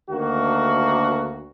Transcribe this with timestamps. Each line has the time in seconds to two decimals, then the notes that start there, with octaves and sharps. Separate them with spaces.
0.11 D2 D#3 A#3 F#4